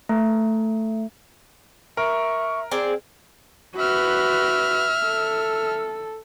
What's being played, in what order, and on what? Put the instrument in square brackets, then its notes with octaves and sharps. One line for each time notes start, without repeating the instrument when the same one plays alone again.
[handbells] A3
[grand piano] A#4 [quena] E5 [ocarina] C#6
[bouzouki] C4 G#4 D5
[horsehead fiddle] F#4 B4 [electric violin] E5 F6
[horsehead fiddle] A4